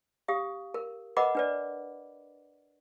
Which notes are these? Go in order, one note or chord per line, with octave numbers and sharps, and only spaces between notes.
G4 F5 D#6
A#4
A#4 B4 D#5 F#5 B5 D6
D4 B4 D5